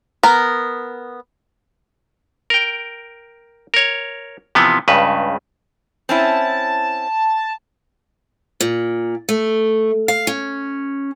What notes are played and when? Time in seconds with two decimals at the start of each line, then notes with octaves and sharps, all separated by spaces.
0.23 B3 A#4
2.50 A#4 G5
3.74 A#4 C#5
4.55 C3 E3 F3 B3
4.88 C#2 G2 C#3 B4
6.09 C4 C#4 E4 A5
8.60 A#2
9.29 A3
10.08 F5
10.27 C#4